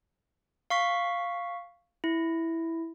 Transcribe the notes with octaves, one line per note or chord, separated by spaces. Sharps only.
F5 C#6 B6
E4